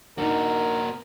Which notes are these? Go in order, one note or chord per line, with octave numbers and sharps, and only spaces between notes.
A#3 D4 D#4 F#4 A#4